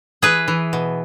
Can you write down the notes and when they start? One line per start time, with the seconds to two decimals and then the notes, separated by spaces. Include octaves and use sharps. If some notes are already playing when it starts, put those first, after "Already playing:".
0.22 E3 G#4 B4
0.48 E3
0.73 B2